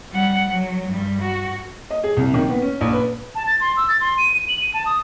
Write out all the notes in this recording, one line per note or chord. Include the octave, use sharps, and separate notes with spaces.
G3 F#5
F#3
G2 G3
F#4
D#5
G#4
C2
D#3
B3
C#4
A#1
B4
A5
A6
C6
E6
A6
C6
D#7
D#7
F#7
D#7
A5
D#6